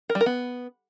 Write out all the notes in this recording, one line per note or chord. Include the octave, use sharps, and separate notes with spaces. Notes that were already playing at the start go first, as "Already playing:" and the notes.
A#4
G3
A#4
B3